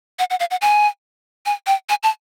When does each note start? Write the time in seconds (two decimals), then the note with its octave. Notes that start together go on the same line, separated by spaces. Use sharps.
0.19 F#5
0.30 F#5
0.40 F5
0.51 F#5
0.61 G#5
1.46 G#5
1.67 G5
1.89 G#5
2.03 A5